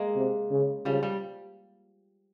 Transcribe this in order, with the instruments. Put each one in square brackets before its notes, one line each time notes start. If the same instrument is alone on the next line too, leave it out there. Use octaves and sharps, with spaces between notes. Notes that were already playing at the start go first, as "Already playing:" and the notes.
Already playing: [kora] G#3 A#3
[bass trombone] C3
C#3
[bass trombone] C#3 [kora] F3 G3
[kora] G3